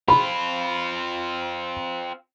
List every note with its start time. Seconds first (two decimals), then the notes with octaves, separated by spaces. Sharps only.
0.08 C4 F4 B5